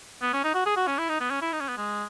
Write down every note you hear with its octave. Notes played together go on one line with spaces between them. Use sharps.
B3
C#4
D#4
F#4
G#4
F#4
C#4
E4
D#4
B3
C#4
E4
D#4
C#4
B3
G#3